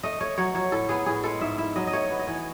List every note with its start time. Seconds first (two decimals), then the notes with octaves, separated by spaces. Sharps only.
0.03 A3 D#5
0.20 A3 C#5
0.38 F#3 C#5
0.55 F#3 C#5
0.72 A2 A4
0.89 B3 G#4
1.06 A2 G#4
1.23 G#3 A4
1.41 G#2 E5
1.58 E4 E5
1.76 F#3 D#5
1.87 D#5
1.93 A3 C#5
2.10 B3
2.19 D#5
2.27 E3 C#5